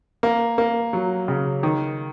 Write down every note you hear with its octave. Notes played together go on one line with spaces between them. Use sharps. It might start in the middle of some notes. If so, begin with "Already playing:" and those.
A#3
A#3
F#3
C#3
D#3